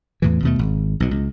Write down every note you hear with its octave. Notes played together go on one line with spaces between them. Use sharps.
E2 A2 E3
D#2 B2 A3
G#1
B1 B2
C#2